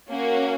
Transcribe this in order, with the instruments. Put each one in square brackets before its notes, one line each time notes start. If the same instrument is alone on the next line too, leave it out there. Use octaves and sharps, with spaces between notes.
[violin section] A#3 C#4 F#4